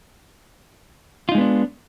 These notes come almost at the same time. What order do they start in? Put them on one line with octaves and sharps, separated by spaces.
F4 D#4 G#3 B3 D4